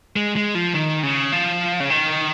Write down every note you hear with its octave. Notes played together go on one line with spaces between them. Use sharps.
G#3
G#3
F3
D#3
C#3
F3
C#3
D#3